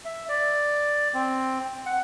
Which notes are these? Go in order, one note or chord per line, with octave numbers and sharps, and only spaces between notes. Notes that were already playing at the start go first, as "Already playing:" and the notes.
E5
D5
C4
F#5